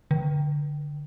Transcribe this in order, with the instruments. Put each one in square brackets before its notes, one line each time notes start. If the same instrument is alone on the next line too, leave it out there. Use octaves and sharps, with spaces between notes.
[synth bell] D3